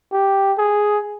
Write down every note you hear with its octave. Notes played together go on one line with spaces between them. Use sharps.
G4
G#4